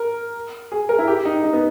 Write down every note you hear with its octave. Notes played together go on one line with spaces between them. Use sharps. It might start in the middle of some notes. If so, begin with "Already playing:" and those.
Already playing: A#4
G#4
A#4
E4
G4
D#4
D#4
B3